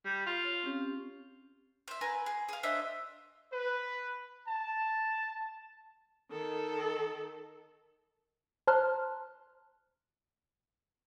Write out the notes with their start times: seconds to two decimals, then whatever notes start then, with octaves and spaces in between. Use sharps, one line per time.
0.05 G3
0.26 F4
0.44 C#5
0.63 C4 C#4 G4
1.88 C5 E5
2.01 A#4 B4 G#5
2.26 G#4
2.49 G#4 F5
2.63 D4 C5 D#5 E5
3.52 B4
4.47 A5
6.31 D#3 A4
8.67 C5 A5 A#5 C6 F6 F#6